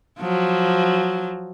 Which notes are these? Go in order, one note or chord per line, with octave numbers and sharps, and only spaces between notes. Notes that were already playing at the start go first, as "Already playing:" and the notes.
F3 F#3